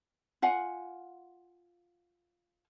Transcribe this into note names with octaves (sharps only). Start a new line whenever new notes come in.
F4 F5 F#5 G#5